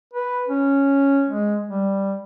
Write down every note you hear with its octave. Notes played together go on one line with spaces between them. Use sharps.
B4
C#4
G#3
G3